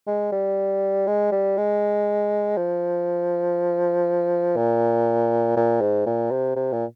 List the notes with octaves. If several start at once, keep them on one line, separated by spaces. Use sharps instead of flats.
G#3
G3
G#3
G3
G#3
F3
A#2
A#2
G#2
A#2
C3
C3
A#2